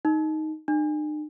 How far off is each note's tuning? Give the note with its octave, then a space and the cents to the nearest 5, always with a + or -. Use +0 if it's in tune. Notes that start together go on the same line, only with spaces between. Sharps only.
D#4 +5
D#4 -45